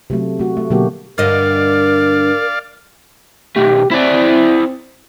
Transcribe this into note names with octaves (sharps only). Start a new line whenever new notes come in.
C3 F#3 A3
A3 F#4
A3
B2 D3 F#3 A#3 F#4 G4
G2 D3 A#4 D5 D#5 F5
B1 A3 G4
C4 E4 D5